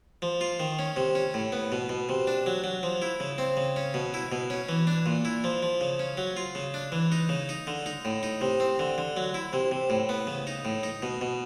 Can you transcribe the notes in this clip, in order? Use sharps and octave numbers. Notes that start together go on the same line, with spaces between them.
F3
F4
D#3
C#4
C3
C#4
A2
B3
B2
B2
C3
D4
F#3
F#3
F3
E4
C#3
C4
C#3
C#4
B2
E4
B2
C#4
E3
D4
A#2
E4
F3
F3
C#3
C#4
F#3
F4
C#3
D4
E3
D#4
C#3
D#4
D3
D#4
A2
D#4
C3
C4
D3
D3
F#3
E4
C3
C3
A2
B3
C#3
D#4
A2
D#4
B2
B2